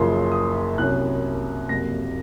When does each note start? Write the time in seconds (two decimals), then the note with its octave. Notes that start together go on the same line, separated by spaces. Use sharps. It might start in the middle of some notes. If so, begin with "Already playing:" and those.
Already playing: F#1 F#2 C#3 F3 C6
0.32 D#6
0.78 C2 C3 F#3 C#4 F#6
1.69 F#1 F2 C3 F#3 A#3 A#6